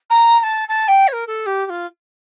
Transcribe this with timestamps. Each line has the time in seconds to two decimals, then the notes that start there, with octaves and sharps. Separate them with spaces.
0.10 A#5
0.39 A#5
0.43 A5
0.68 A5
0.88 G5
1.07 C#5
1.12 A#4
1.27 A4
1.46 G4
1.65 G4
1.69 F4